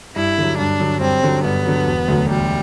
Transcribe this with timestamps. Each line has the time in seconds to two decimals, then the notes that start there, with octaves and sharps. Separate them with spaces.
0.16 G2 E4
0.38 D3 F#3
0.59 G2 D4
0.80 D3 F#3
1.01 G2 C4
1.23 D3 F#3
1.44 G2 B3
1.66 D3 F#3
1.87 E1
2.08 D2 D3 F#3
2.30 E1 G3